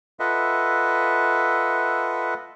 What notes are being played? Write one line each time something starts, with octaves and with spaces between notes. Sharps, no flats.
F4 A4 B4 D#5 E5 F#5